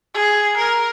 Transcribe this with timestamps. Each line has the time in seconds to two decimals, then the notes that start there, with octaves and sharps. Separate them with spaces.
0.14 G#4
0.57 A#4